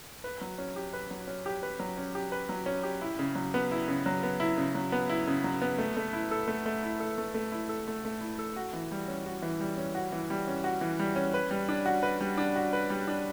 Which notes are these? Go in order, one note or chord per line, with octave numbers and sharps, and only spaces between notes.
B4
F#3
C#4
G4
B4
F#3
C#4
G4
B4
F#3
C#4
G4
B4
F#3
C#4
G4
E4
C#3
F#3
B3
E4
C#3
F#3
B3
E4
C#3
F#3
B3
E4
C#3
F#3
B3
A3
A3
E4
A4
A3
A3
E4
A4
A3
A3
E4
A4
A3
A3
E4
A4
F#4
E3
G3
C#4
F#4
E3
G3
C#4
F#4
E3
G3
C#4
F#4
E3
G3
C#4
B4
G3
D4
F#4
B4
G3
D4
F#4
B4
G3
D4